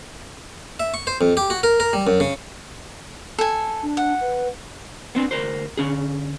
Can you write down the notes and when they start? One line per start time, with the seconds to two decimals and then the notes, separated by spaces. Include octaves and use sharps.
0.80 E5
0.94 C#6
1.07 C5
1.21 F2
1.37 G4
1.50 F#4
1.63 A#4
1.80 A#4
1.93 G3
2.07 F#2
2.20 C#3
3.38 A4 G#5
3.83 D4
3.97 F#5
4.21 B4
5.15 B3 C4 D4
5.31 D2 A#4 C5
5.77 D3 C#4 G#4